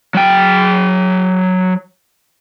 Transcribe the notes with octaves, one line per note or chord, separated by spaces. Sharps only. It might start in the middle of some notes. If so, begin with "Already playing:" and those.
F#3 G5